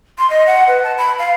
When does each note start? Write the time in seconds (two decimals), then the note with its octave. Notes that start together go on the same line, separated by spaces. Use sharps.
0.18 C6
0.30 D#5
0.47 F#5
0.68 B4
0.84 A5
0.98 B5
1.19 F5